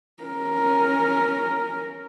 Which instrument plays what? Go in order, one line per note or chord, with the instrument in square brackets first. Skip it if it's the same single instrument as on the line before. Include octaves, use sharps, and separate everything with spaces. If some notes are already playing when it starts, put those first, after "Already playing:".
[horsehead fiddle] C#4 A#4